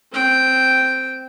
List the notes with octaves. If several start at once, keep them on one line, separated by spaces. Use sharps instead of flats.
C4 G5